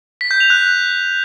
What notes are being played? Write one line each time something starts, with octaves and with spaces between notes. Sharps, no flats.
B6
G6
F7
F#6